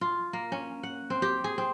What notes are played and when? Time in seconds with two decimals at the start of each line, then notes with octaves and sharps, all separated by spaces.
0.01 F4
0.33 A#3
0.52 C#4
0.83 F#5
1.10 C4
1.22 G4
1.44 G#4
1.58 C4